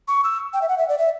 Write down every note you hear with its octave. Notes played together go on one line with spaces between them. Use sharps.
C#6
E6
G5
E5
F#5
E5
D5
E5